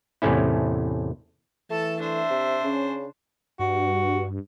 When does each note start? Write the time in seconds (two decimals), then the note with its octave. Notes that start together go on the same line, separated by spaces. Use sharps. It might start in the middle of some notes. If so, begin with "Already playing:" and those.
0.22 E2 A2 C3 A3 C#4 E4
1.70 E3 A3 A4 A5
2.00 D4 C5 E5
2.30 C3
2.64 C#3 C#4
3.59 G2 F#4